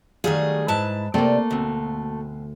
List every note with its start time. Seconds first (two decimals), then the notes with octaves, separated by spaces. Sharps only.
0.24 D#3 F#3 G3 A3 G#4 F5
0.68 G#2 E4 B4 A5
1.14 C3 A3 A#3 C4 D5 G5
1.51 D2 B2 C4